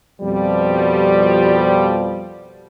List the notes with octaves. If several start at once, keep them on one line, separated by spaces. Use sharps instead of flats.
F2 B2 F3 G3